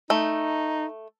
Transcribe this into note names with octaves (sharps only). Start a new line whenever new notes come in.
A3 D#4